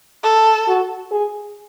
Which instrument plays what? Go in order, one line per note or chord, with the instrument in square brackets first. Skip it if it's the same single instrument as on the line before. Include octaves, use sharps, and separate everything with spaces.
[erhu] A4
[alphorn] F#4
G#4